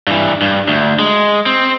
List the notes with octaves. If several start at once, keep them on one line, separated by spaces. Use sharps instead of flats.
G2 E3
G2
D2
G#3
C4